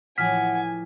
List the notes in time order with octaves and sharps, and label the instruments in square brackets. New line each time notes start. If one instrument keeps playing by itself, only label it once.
[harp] A2 E3 F3 [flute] F#5 [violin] G#5 [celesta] F6 B6